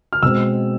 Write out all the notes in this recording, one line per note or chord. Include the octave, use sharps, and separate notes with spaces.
F6
B2 G#3 C4 E6